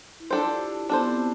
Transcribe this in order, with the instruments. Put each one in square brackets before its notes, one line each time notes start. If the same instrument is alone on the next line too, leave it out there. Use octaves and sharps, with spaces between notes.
[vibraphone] E4
[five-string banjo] D4 A4 C5 [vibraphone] F4
[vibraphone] G4
E4
[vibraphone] B3 [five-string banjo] D4 A4 C5
[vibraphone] C4